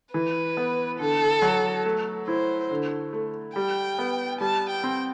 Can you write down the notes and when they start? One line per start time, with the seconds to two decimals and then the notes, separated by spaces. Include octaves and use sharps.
0.14 E3 B4
0.57 B3
1.00 D3 A4
1.42 F#3
1.85 A3
2.28 E4 C5
2.71 D3
3.13 A3
3.56 G3 G5
3.99 B3
4.41 G3 A5
4.70 G5
4.84 C4